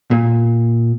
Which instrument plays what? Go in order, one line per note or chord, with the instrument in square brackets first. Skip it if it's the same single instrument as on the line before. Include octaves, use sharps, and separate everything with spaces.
[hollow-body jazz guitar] A#2